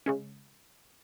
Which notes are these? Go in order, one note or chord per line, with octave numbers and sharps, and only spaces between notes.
C#3 G#3 C#4